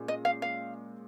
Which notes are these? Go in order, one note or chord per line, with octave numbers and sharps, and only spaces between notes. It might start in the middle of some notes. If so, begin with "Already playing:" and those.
Already playing: A#2 G#3 C#4
D#5
F5
F5